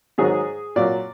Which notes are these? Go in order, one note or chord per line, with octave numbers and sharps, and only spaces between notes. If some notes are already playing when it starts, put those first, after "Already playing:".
G#2 D#3 F#3 G#4
A#2 F#3 D5